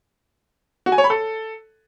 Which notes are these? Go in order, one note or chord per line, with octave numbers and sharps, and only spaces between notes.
F#4
G#5
C#5
B5
A4